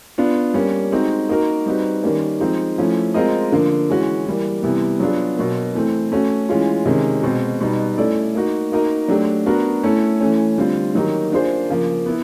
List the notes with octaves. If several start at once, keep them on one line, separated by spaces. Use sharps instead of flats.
B3 D4 F4
G3 A#3 C#4
G#3 C4 D#4 F#4
A#3 D#4 F#4 A#4
G3 C4 D#4 F#4 B4
D#3 G3 A#3 C#4
F3 G#3 C4 D#4
F3 A3 C#4 E4
G#3 C4 F4 A#4 D#5
D3 F3 A#3
E3 G#3 C#4 F#4
E3 G3 A#3
C3 E3 G3 B3 E4
F#3 B3 D4 F4 G#4
B2 F#3 A#3
E3 A3 C4
A3 C#4 F#4
E3 G#3 C#4 F4
C3 D#3 G#3 C#4
B2 G#3 C4
B2 G3 B3 D#4
A3 C#4 E4 A4 D5
A#3 D#4 F#4
A#3 D#4 F#4 A#4 D#5
F#3 A3 D4 G4
B3 D4 F#4 A#4
A3 C#4 E4 A4
E3 A3 C#4
D3 G3 C4 F4
D#3 F#3 A#3 D#4 G4
A#3 D4 F4 G#4 C5
C#3 F3 A#3
B3 E4